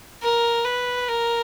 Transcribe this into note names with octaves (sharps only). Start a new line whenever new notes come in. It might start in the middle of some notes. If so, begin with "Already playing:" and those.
A#4
B4
A#4